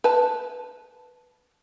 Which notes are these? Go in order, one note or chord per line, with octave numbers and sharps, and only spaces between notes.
B4 A5